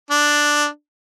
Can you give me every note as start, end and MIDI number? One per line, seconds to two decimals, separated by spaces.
0.10 0.67 62